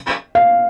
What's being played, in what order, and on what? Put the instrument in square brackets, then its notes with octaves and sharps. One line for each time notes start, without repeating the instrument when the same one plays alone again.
[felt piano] F5